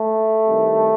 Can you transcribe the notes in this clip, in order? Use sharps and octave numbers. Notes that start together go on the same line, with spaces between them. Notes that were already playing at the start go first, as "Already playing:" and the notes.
Already playing: A3
C2 C3 D#3